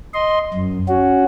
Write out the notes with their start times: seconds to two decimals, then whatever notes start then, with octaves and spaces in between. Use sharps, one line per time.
0.14 D#5 C6
0.54 F#2
0.88 C#4 F#4